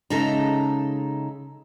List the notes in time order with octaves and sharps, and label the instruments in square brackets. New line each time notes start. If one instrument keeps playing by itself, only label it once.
[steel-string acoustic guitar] C#3 G#3 D#4 A4 E5 A#5